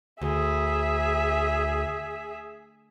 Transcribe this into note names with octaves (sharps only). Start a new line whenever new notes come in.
D2 G#4 E5